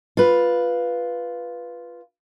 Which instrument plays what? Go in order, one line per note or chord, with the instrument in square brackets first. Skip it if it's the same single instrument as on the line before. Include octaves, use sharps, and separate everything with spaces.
[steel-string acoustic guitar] F4 B4